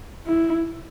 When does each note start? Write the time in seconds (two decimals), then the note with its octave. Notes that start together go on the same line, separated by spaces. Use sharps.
0.27 E4